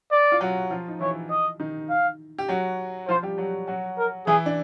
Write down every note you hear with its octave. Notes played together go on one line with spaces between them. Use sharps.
D5
F4
F#3 F#4
F3 F4
D#4
E3 E4 C#5
D#5
D#3 D#4
F5
G4
F#3 F#4
F3 F4 C5
G3 G4
F#3 F#4
F#3 F#4
A#4
E3 E4 G#4
D4